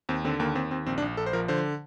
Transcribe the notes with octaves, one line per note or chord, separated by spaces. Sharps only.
D#2 C4
D3 C4
D#2 A#3
D#2 C4
D#2 C4
A#1 C4
D4
A#1
A#1 A4
C5
F3 A#4
D3 C5